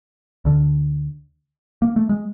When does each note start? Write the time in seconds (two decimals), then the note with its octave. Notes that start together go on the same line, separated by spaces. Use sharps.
0.45 D2 D3
1.82 A#3
1.96 A3
2.09 G#3